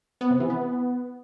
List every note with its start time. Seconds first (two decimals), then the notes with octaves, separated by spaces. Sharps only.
0.21 B3
0.31 C3
0.40 E3
0.50 B3